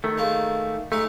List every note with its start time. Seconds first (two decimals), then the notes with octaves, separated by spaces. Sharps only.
0.04 D#3 A3
0.18 G#3 A#3
0.92 G#3 A3 D#4